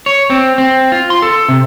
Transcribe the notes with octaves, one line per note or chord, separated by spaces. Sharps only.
C#5
C4
C4
F4
C6
A4
C3